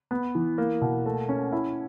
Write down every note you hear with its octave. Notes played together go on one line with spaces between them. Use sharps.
B3
E3
A#3
B2
A3
C#4
E4